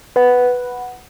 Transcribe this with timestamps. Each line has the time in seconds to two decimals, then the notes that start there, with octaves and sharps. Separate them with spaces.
0.16 B4 F#5